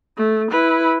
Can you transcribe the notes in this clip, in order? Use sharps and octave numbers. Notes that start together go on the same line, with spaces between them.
A3
E4 B4